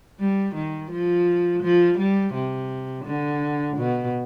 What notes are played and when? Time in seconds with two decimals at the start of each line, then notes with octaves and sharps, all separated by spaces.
0.20 G3
0.55 D#3
0.91 F3
1.63 F3
1.98 G3
2.34 C3
3.05 D3
3.77 B2